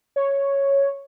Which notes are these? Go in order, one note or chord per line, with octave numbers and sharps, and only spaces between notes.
C#5